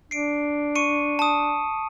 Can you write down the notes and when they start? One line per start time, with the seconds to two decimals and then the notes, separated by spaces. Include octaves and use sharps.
0.11 D4 C7 D7
0.75 C#6 C#7 D#7
1.19 A5 D#6